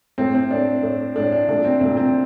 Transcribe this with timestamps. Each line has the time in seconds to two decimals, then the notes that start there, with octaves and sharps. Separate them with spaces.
0.18 A2 A3 C4
0.35 C4
0.51 A2 A3 D4
0.83 A2 A3
1.15 A2 A3 D4
1.32 D4
1.48 C2 A#2 A3 D4
1.64 C4
1.81 C2 A#2 A3 C4
1.97 C4